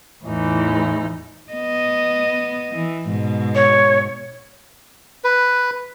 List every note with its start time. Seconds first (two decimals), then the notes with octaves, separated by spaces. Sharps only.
0.24 E2 A2 E3 D#4
1.52 B3 D#5
2.75 E3
3.10 G#2 B2
3.55 C#5
5.24 B4